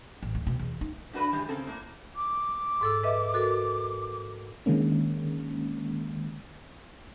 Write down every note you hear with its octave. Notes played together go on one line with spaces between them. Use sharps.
A1
D2
B2
E2
D#4
G2 D4 F#4 B4
E3 G3 G#3
C#3 C4 A4 A#4
A2 A#3
D6
G#2 A4 E6
B4 D#5 E5
F#4 A4 A#4
D3 D#3 G#3 A#3 C#4